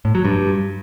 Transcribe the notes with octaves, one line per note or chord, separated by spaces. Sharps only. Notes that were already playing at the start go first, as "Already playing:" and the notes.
A2
F#3
G2